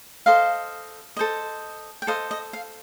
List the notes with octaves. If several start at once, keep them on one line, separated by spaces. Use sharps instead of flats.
A4 C5 D#5 F5
A4 C5 D#5
G5
A4 C5 D#5 F5
D#5
F5